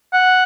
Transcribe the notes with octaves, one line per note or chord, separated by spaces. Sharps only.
F#5